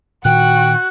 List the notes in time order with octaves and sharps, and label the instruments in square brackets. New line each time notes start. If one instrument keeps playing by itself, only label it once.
[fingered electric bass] A#2 D#3 [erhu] F#4 [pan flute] G5 [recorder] F#6